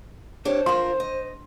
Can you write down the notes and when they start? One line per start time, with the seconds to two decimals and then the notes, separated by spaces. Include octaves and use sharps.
0.45 D4 G4 C5 C#5
0.66 F4 A#4 C6
1.00 D#5